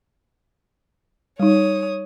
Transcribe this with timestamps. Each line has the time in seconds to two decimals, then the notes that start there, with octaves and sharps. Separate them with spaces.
1.40 G3 D#4 C#5 D#6